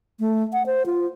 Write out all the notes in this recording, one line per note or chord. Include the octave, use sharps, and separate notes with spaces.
A3
F#5
C5
F4